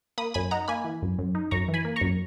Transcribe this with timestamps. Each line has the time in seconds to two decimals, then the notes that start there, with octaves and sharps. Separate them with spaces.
0.18 A#3 B5 D#6
0.34 F#2 G#5 B5
0.51 D#4 F#5 A#5
0.68 A#3 G#5 B5
0.84 E3
1.02 F#2
1.19 F#2
1.35 D#4
1.51 F#2 A#5 C#6
1.68 E3
1.74 G#5 B5
1.85 A#3
1.96 A#5 C#6
2.01 F#2